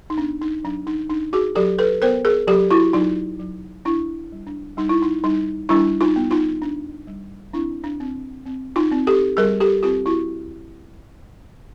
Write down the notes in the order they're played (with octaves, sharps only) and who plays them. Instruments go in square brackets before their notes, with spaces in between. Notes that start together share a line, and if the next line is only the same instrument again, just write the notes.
[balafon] D#4
B3 D4
D#4
F#3 D4
D#4
D4 D#4
F#4 G#4
F#3 G4 A4
A4 B4
B3 A#4 C5
G#4 A#4
F#3 G4 A4
E4 F#4
F#3 D#4 F4
F#3
D4 E4
G3
D4
G3 D#4
E4
D#4
G3 D#4
G3 D4 E4
D#4 F4
B3
D#4 F4
D4
G3
C4 D4 E4
D4
C4
C4
D#4 F4
C4
G4 A4
G3 G#4 A#4
G4 A4
C4 F4 G4
E4 F#4